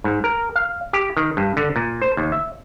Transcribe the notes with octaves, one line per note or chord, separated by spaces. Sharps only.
G#2
A#4
F5
G4
D#3
G2
D3
A#2
C5
D#2
E5